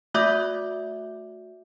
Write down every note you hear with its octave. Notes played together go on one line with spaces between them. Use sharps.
A3 F#4 E5 D6 G6